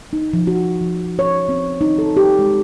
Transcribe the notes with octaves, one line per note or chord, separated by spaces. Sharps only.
D#4
F3
F#4
F3
C#5
C4
D#4
A4
G4
G#3